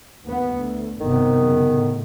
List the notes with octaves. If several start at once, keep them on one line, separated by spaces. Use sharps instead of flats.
D#2 B3
D2
G1 C3 D#3 B3
F#2 C#3
A2